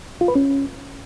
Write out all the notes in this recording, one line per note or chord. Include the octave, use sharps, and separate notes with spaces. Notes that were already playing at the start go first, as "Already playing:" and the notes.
F4
B4
C#4